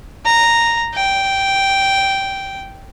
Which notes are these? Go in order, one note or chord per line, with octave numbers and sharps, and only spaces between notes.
A#5
G5